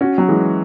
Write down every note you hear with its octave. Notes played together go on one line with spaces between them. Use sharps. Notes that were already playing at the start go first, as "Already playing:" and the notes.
C#4 F#4
F#3
E3 G#3